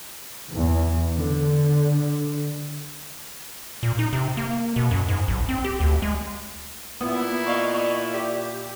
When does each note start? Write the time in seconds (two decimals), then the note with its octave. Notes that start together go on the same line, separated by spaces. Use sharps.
0.52 E2
1.16 D3
3.83 A#2
3.99 D#4
4.13 C3
4.37 A#3
4.76 B2
4.91 F#2
5.08 G#2
5.28 B1
5.49 C4
5.64 G4
5.80 D2
6.02 G#3
7.01 A#2 B3 E4
7.46 D5 D#5 F5 C#6
8.14 G4